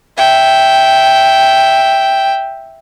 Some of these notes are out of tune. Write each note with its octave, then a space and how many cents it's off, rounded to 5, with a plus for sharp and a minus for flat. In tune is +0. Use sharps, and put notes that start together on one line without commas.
E5 +0 G5 +0